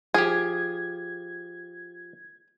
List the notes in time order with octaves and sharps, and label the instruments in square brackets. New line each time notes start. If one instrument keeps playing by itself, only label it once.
[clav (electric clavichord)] F3 G4 [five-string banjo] G#4 [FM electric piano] G#6